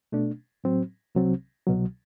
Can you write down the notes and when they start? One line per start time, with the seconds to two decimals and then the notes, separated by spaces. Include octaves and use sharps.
0.12 B2 A3 D4
0.64 A2 F#3 C4
1.15 C2 C3 F#3 C4
1.67 C2 B2 F#3